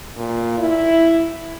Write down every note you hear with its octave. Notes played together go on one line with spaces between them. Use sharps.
A#2
E4